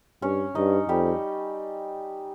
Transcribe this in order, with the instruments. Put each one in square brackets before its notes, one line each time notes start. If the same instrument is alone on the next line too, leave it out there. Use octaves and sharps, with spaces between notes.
[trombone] G2 [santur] C#4 C#5
[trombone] G2 [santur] D#4 D#5
[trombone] F2 [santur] G3 G4